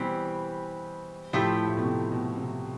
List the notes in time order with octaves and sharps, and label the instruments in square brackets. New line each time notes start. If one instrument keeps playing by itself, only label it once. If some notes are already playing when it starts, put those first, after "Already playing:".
Already playing: [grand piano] B2 [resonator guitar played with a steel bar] E3 G3 C4
[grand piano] A2 [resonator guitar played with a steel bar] F3 A3 E4 G4
[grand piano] A2
B2
C3
B2
C3